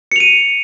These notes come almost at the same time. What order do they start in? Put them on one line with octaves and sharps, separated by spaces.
C#7 F7 D#7